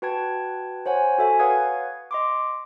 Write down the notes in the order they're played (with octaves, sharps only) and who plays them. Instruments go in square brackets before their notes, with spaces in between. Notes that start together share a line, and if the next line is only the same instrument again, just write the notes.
[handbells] F#4 B4 G5 A5 G#6
C5 C#5 F#5 G#5
F#4 A4 E5 G#5
B4 C#5 F5 F#5 D#6 G#6
D#5 C6 D6